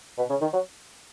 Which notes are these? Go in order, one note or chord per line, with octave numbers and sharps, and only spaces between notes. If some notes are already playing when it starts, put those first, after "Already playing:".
B2
C#3
D#3
F#3